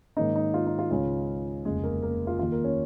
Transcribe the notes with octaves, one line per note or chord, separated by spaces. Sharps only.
G#2 D#3 A#3 C#4 D#4 D#5
D#4
F4
D#4
F4
C#2 C#3 G#3 C#4 F4
F1 D#2 C#3 G#3 G#4
A#3 A#4
A#3 A#4
F4
D#2 D#3 A#3 F4
A#3 A#4
C#4 C#5